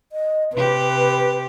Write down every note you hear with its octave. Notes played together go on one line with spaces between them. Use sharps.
D#5
C3 G4 B4